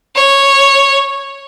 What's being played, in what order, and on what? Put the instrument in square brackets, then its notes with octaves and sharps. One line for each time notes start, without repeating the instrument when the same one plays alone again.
[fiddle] C#5